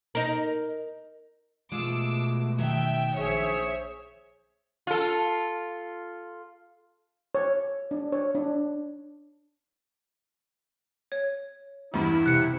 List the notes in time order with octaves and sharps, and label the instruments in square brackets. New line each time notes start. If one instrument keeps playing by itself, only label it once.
[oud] D#4 A#4
[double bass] B2 A3 [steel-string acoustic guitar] G#3 F4 [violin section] D6 E6
[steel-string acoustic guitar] D#3 F#3 [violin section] E5 G5
[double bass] A#1 [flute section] G#4 C5 [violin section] C#5 E5
[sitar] F4 A4
[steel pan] C#5
D4
C#5
D4
[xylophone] C#5
[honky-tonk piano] E2 G2 [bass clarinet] E4
[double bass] C3 [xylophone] F#6 C#7